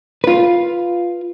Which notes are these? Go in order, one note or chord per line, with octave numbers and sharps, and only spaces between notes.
F4 B4